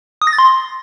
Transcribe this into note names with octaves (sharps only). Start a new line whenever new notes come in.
D#6
A#6
A6
C6